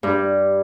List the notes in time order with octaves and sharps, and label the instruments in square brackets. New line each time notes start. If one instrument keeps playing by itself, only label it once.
[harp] G2